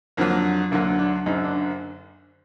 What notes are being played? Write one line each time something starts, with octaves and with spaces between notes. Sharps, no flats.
F2 D3 F#3 A#3
D2 D3 F#3 A#3
D4
F#1 F#2 D3 D#4
D4